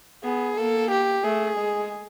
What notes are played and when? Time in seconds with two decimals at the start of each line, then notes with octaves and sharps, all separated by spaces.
0.24 B3 G#4
0.57 A#3 A4
0.91 G4
1.24 A3 G#4
1.58 G#3